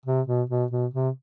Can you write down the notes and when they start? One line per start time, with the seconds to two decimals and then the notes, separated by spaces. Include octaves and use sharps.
0.06 C3
0.27 B2
0.50 B2
0.71 B2
0.94 C3